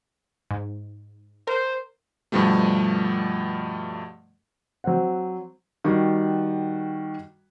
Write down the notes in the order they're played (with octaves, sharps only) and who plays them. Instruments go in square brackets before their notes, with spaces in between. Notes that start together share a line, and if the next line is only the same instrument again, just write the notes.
[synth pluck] G#2
[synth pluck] A#4 [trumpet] C5
[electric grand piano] G2 B2 F3 G3 A3
[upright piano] F#3 C4 C5 F#5
[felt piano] D#3 G3 F#4